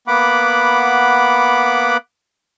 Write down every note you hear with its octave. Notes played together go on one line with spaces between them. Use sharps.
A#3 B3 F#5 B5 D6